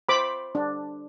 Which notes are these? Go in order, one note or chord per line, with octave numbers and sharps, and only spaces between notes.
C5 B5 D6
D4